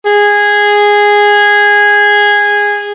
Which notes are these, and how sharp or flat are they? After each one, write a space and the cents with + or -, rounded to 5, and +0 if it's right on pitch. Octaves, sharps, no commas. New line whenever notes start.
G#4 -10